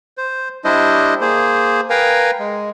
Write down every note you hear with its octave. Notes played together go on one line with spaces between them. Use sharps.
C5
G3 D4 E4 C5 D#5
A#3 G#4 C5
A#4 B4 F5 G5 G#5 A#5
G#3